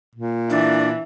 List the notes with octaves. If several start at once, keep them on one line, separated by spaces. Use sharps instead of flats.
A#2
E3 D4